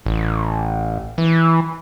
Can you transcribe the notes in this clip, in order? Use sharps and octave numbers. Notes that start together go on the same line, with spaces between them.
A1
E3